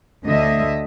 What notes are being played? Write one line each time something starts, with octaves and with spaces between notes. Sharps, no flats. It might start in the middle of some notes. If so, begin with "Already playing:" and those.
D2 D3 A3 D#5 E5